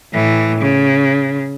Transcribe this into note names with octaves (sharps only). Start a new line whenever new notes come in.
A2 E3
C#3